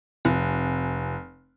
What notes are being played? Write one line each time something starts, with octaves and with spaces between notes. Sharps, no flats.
F1